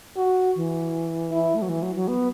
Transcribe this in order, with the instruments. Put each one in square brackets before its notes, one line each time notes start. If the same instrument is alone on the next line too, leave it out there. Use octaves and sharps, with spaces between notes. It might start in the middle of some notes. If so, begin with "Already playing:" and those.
[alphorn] F#4
[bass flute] E3
[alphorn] E4
[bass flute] A3
F#3
E3
F#3
F#3
B3